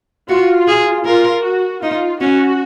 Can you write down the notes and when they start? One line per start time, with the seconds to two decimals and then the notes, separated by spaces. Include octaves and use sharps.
0.29 F4 F#4
0.68 G#4
1.06 F4 A#4
1.44 F#4
1.83 D#4 F4
2.21 C#4 F#4